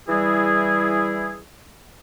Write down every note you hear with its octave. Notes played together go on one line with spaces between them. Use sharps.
E3 G3 E4 G#4